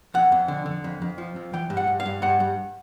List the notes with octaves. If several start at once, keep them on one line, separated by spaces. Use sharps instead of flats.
F2 F#5
F2
D3
D3
F2
F2
F3
F2
E3 G5
G2
F#5
G2
F5
G2
G2 F#5
G2